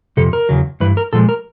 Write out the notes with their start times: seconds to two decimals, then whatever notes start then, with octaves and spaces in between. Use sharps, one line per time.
0.17 F2 C3 A4
0.33 A#4
0.49 E2 C#3 F#3
0.80 G2 E3 B4
0.97 A#4
1.13 A#2 F3 G#3 A4
1.29 A#4